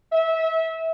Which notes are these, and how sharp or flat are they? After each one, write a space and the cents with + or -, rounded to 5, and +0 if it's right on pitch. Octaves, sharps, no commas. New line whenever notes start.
E5 -20